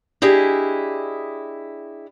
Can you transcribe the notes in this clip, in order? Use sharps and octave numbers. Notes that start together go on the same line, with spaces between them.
D4 E4 G4 G#4 D#5